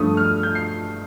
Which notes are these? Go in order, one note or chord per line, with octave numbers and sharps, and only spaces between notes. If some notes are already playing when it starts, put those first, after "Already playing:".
Already playing: G2 F3 A3 D#6
F6
G6
C7